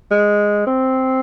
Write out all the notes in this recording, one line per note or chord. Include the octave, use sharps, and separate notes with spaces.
G#3
C4